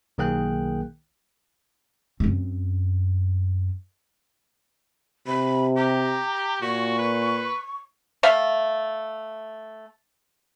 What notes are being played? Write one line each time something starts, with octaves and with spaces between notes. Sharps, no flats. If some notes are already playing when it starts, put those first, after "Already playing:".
B1 D#3 A#3 G#4 G5 F#6
F#2 C4
C3 B5
G4 A#5
A#2 F#4 C#6
B4
A3 E5 F5